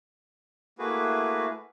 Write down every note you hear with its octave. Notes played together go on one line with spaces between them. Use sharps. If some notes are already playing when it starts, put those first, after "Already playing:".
A3 A#3 E4 F#4 G#4 B4